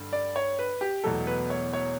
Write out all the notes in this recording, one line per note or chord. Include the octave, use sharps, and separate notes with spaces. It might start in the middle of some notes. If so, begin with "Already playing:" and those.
Already playing: G2 D3
D5
C#5
B4
G4
E1 E2 B2 F#3 A3 A4
B4
C#5
C#5